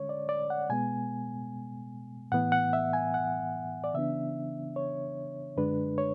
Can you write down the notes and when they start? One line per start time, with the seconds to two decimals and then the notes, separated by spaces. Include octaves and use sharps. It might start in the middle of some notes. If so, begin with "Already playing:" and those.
Already playing: D3 G#3 C#4 C#5
0.09 D5
0.29 D5
0.50 F#5
0.69 B2 G#3 B3 G#5
2.32 A2 E3 B3 F#5
2.52 F#5
2.73 E5
2.93 G#5
3.14 F#5
3.84 D5
3.94 C#3 E3 B3 D4 E5
4.76 C#5
5.57 F#2 D3 G#3 D4 B4
5.98 C#5